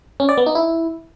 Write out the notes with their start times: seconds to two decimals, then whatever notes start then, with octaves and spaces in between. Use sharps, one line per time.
0.20 C#4
0.29 D5
0.38 B3
0.46 D#4
0.55 E4